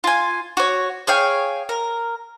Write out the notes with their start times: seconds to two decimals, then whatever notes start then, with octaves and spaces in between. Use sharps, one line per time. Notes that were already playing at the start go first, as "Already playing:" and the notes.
0.04 F4 G#5
0.57 F#4 C#5
1.07 G#4 C#5 F5 G5
1.69 A#4